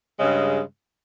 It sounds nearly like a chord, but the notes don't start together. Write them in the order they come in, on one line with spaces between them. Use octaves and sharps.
G#3 C#3 G2